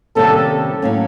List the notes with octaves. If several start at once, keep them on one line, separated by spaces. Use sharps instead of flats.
C3 D#3 G3 A#3 C#4 A4
A2 F#3 A#3 C#4